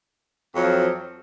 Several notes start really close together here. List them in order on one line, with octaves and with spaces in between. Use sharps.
F2 F#3 F3